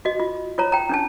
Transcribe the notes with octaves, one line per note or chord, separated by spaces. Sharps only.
F#4 D#5
F4
F4 C#5 A#5
G5 A#5
C#4 D4 A5